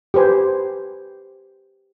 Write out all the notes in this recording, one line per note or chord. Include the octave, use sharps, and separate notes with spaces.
G4 B4 C5 G#5